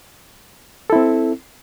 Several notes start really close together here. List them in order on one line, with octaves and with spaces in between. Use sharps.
A4 E4 C4